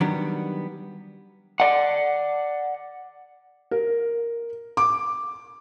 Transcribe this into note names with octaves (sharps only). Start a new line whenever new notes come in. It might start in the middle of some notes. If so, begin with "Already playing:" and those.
D#3 F#3 G3 B3 D4
D5 F#5
A#4
D6